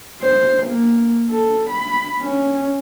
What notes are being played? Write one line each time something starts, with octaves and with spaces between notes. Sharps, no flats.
C5
A#3
A4
B5
C#4